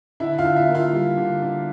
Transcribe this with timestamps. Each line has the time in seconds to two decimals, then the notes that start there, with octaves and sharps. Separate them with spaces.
0.20 D3 E4 E5
0.38 F4 F5
0.45 D3
0.56 E4 E5
0.69 A#3
0.75 F4 F5
0.93 G3
1.17 D3
1.42 D3